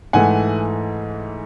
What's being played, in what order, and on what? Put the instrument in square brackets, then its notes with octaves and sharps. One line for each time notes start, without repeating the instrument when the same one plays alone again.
[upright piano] G#2 E3 A3 F#5 G#5